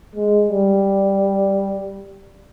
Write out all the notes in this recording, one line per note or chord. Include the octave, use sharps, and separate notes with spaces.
G#3
G3